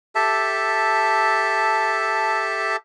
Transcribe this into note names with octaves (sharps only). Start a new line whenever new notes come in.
G4 A4 E5 A5